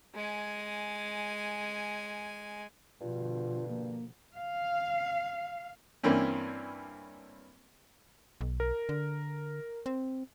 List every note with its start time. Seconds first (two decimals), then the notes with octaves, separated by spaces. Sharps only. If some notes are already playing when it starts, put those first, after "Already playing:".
0.15 G#3 G#5
3.01 G2 B2 D3 F3 F4
3.68 A#3
4.36 F5
6.03 G2 E3 A#3 C4 C#4
8.41 B1
8.60 A#4
8.89 D3
9.86 C4